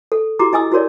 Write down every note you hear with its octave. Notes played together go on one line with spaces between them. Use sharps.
A4
E4 F#4 G4 A#5 D6
E4 D#5 G#5 D#6 E6
E4 F#4 A#4 C#5 D5